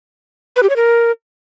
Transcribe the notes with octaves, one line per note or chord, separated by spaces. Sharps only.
B4
G4
C#5
A#4